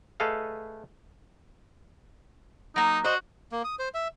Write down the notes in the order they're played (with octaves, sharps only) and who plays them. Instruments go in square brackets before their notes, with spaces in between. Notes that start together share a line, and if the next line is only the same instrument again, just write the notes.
[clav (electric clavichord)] A3 G#4 A4 B4 D#5 F5
[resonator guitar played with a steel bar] F#3 A#3 [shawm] D#4
[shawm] F#4 [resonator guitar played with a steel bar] C5 D#5
[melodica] A#3
D#6
C5
E5